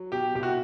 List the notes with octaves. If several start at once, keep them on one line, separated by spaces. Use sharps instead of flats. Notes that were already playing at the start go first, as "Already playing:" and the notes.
Already playing: F#3
B2 G4
C2 G4
F#4